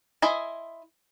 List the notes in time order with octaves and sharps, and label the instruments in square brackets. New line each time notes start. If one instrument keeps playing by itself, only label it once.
[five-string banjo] E4 C5 D#5 G#5